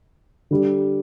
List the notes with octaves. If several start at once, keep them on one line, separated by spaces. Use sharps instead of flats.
D3 G3